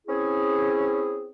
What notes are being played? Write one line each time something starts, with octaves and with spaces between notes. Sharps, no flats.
C4 C#4 E4 G#4